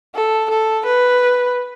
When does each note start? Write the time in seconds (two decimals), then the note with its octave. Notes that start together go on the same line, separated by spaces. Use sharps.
0.15 A4
0.50 A4
0.85 B4